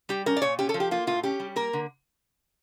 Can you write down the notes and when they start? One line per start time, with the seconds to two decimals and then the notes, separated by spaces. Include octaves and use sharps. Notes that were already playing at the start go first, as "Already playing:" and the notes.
0.09 G3 G4
0.26 C#4 A#4
0.37 D5
0.42 A#2 C#5
0.59 C#4 G4
0.69 A4
0.74 F3
0.80 G4
0.91 A#3 F4
1.07 A2 F4
1.23 C#4 G4
1.40 G3
1.56 A#3 A#4
1.73 D3